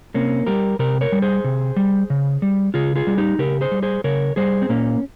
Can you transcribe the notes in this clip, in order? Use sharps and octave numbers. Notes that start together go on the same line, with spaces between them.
C3 A#3 C#4
G3 G4 A#4
C3 G4 A#4
A#4 C#5
G3
G#4 C5
C3
G3
C#3
G3
C#3 F4 G#4
F4 G#4
G3
D#4 G4
C#3 G4 A#4
G#4 C5
G3
G#4 C5
C#3 A#4 C#5
G3 G#4 C5
C4
A#2 A#3 C#4